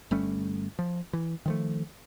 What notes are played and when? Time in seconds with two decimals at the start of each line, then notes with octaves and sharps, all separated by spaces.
0.11 G1 G3 A3 C#4
0.79 F3
1.13 E3
1.46 D#3 F3 A3